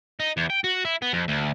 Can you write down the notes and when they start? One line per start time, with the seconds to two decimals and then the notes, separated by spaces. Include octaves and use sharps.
0.20 D#4
0.37 E2
0.50 G5
0.64 F#4
0.85 E4
1.02 B3
1.13 F2
1.28 D2